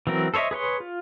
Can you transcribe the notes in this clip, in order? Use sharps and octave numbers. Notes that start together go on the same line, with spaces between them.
E3 F#3 C4 A#4
A4 C5 C#5 D#5 E5
G#4 B4 C#5 C6
F4